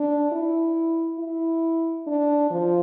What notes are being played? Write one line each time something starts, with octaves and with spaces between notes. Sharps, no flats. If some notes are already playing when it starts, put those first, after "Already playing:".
Already playing: D4
E4
E4
D4
F3